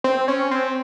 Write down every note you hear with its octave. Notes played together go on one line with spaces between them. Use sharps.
C4
C#4
C4